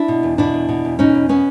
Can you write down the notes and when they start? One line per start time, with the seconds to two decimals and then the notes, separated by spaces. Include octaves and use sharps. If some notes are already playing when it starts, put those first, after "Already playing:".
Already playing: D4 E4
0.08 B2
0.23 E2
0.38 B2 D4 E4
0.54 E2
0.69 B2
0.85 E2
0.99 B2 C#4 D#4
1.14 E2
1.29 B2 B3 C#4